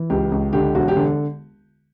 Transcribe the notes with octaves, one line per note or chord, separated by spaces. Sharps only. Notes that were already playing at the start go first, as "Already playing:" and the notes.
Already playing: E3
C#2 G4
C#2
D3 G4
E1 F#4
G4
D3